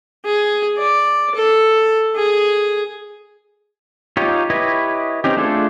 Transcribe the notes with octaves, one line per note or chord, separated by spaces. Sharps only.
G#4
D5
A4
G#4
D#4 F4 G4 C#5
E4 G4 B4 C#5 D#5
C4 C#4 D#4 G4
A3 D4 F4 G#4 A4